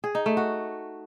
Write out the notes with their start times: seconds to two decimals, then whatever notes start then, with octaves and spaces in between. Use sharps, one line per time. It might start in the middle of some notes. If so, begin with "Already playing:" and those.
0.04 G#4
0.15 D#4
0.26 A3
0.37 F#4